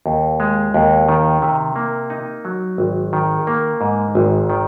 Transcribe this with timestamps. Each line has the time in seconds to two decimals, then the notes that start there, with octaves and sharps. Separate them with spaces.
0.06 D#2
0.40 G#3
0.74 D#2
1.09 D#3
1.42 C3
1.76 A#3
2.10 D#4
2.45 F#3
2.78 G#1
3.13 D#3
3.47 A#3
3.81 G#2
4.15 G#1
4.50 D#3